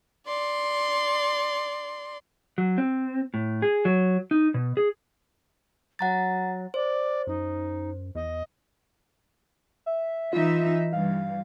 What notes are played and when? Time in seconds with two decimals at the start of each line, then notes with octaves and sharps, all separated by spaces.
0.26 D5 C6
2.58 F#3
2.78 C4
3.34 A2
3.62 G#4
3.85 F#3
4.31 D#4
4.54 B2
4.77 G#4
5.99 F#3 F#5 A#5 A6
6.74 C5 D5
7.27 F#2 D#4
8.15 E2 D#5
9.86 E5
10.33 E3 D#4 F4 E5
10.93 G2 E3 F5